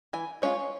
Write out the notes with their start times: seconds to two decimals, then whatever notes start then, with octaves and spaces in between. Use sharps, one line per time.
0.13 E3 G#5
0.42 G#3 C#4 F4 C#5